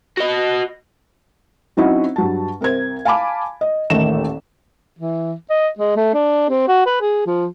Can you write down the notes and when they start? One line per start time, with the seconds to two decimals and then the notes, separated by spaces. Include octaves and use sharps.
0.17 F#4 D#5
1.77 F#3 C4 C#4 D#4 E4 F#4
2.16 G2 F#3 A5
2.61 C2 A#4 C5 G#6
3.05 F5 G#5 A5 B5 D6
3.61 D#5
3.90 D#1 A1 D#3 A3 E7
4.99 E3
5.50 D#5
5.79 G#3
5.96 A3
6.14 D4
6.50 C4
6.68 F#4
6.86 B4
7.01 G#4
7.27 F3